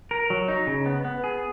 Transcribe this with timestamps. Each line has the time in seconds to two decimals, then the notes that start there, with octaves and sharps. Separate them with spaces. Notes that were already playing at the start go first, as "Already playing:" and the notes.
0.11 A#4
0.30 F#3
0.48 D#4
0.67 C#3
0.86 B3
1.05 B3
1.24 G#4